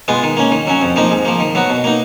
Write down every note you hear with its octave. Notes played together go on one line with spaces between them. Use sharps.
G#3 B3 F4
D#3
A#3 C#4
D#3
F#3 C#4
F2
F3 A#3 D#4
G#2
F3 A#3
D#3
F#3 B3 F#4
B2
A#3 D#4